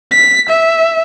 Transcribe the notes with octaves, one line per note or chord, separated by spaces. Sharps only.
B6
E5